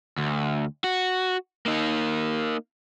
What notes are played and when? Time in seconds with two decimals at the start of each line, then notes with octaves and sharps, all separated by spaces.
0.18 D2
0.84 F#4
1.66 A#3 D#4